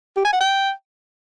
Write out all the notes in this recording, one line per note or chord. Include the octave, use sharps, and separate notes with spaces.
G4
G#5
F#5
G5